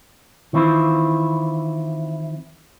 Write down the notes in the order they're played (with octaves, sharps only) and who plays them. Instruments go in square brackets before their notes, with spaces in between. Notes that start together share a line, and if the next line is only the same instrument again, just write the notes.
[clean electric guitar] D#3 E3 C4 E4 F4